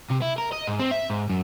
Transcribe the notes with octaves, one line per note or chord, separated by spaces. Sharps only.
C3
E4
A#4
D#5
G#2
C4
E5
G#2
F#2